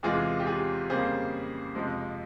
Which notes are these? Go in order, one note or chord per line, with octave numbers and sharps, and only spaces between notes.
E2 C3 E3 G#3 F4 G#4
G4
F4 G#4
F2 C#3 G3 A#3 G#4 C5
F2 C3 F3 G#3